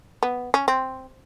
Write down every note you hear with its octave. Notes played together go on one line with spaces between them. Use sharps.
B3
C#4
C4